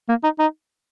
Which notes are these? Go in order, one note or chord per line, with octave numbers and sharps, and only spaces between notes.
A#3
D#4
D#4